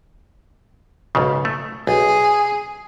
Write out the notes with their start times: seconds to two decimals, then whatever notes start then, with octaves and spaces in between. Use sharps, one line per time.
1.15 B1 G#2 C#3
1.45 A3
1.87 B1 G#4